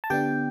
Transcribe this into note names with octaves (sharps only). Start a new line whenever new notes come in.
A5
D3 B3 D4 G4 G5